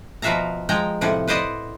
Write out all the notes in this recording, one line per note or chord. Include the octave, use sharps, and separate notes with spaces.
B2 F3 F#4 E5 F5 A#5
F3 G#3 G5 A#5
A2 C3 F3 F#5
B4 C5 D5 D#5 F#5